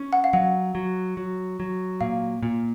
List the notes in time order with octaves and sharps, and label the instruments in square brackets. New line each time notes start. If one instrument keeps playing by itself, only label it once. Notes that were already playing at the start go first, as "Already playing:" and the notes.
Already playing: [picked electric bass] C#4
[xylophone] F#5
F5
[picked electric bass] F#3 [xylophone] F#5
[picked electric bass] F#3
F#3
F#3
[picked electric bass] A#2 [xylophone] F5
[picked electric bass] A#2